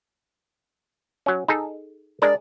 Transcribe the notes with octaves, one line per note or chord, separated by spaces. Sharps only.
F#3 C#4
D#4 G#4 A4
G#3 D4 A#4 D5